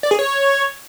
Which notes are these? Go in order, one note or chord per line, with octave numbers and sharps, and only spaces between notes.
D5
G#4
C#5